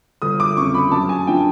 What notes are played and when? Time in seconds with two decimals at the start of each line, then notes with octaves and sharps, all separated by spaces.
0.22 G1 D#6
0.40 D6
0.57 F2 C#3 C#6
0.74 B5
0.91 F#2 A5
1.09 G#5
1.27 D3 F3 G5